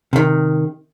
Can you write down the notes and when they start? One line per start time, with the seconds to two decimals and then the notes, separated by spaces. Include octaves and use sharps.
0.13 C3 D#3